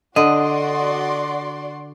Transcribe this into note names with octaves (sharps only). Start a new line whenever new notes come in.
D3 F#4 D5 D#5 C6